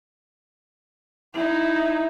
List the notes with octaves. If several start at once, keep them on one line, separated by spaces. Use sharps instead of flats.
D#4 E4